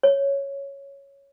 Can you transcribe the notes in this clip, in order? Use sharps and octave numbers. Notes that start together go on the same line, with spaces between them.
C#5